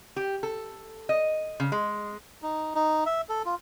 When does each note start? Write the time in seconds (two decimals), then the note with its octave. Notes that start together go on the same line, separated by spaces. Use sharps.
0.16 G4
0.43 A4
1.09 D#5
1.60 C#3
1.72 G#3
2.42 D#4
2.75 D#4
3.06 E5
3.29 A4
3.45 F4